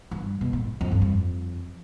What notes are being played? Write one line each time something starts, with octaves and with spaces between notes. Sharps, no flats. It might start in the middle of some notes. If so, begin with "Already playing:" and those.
G2
B2
A2
F2
G2
F2